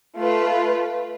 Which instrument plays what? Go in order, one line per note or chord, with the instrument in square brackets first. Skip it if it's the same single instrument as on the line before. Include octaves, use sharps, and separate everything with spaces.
[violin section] A3 F4 B4